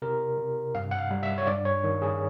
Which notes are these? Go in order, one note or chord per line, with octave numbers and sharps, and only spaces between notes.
C3 A#4
C3
G2 F5
F#5
F5
G3
E5
C#5
G2 D5
C#5
D#3
G#4